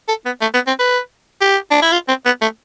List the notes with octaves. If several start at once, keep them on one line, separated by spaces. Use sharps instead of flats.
A4
B3
A3
B3
C4
B4
G4
D4
E4
F4
C4
B3
A3